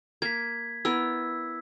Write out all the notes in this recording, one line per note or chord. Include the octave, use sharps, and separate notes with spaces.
A#3 G#6 B6
B3 E4 A#4 E6